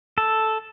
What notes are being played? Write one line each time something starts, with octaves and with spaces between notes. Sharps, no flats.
A4